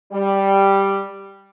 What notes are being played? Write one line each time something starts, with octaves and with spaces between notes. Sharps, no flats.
G3